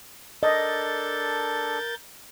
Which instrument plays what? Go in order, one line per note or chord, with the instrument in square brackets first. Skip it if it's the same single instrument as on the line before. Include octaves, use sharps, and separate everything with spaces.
[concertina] D4 A4 [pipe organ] A#4 G6 A6 [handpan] D#5